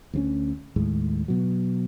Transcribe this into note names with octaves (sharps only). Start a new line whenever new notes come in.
D2 G3 C#4
D#2 A2 G#3
B2 F#3